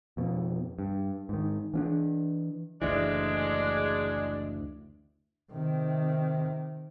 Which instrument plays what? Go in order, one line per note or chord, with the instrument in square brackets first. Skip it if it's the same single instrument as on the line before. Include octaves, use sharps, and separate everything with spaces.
[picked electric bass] F2 B2
G2
G#2 D#3
E3 C#4 D4
[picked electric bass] F#1 D2 E3 [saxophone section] G#3 D4
[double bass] C3 D#3